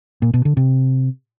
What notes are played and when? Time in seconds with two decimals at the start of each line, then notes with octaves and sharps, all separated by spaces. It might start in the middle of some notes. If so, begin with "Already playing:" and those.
0.22 A#2
0.34 B2
0.45 D3
0.57 C3